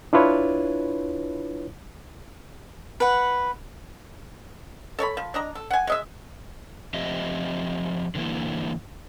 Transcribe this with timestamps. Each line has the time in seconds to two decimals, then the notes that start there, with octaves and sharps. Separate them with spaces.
0.13 D4 E4 F4 B4 C#5
3.00 B4 F#5
4.99 A4 C#5 A5 B5
5.17 F3
5.34 D4 D#5 A#5
5.55 A4
5.71 F#5 G#5
5.87 G#3 D#5 E5
6.94 F3 C4 G4 D#5 E5
8.15 D3 E3 A#3 E4